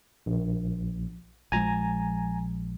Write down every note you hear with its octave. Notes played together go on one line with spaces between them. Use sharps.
A#1
A#1 F3 G#3 G#5 A#5